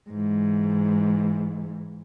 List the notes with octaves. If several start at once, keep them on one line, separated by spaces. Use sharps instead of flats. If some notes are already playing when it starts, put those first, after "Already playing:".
G#2 E3